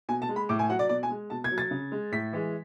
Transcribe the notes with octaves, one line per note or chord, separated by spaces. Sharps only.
B2 G#5
A5
G#3
B5
A2 D6
G#5
F#3 F#5
D5
B2 D5
G#5
G#3
B2 A5
G#6
F#3
A6
C#3
G#3
A2 B6
E3 G#3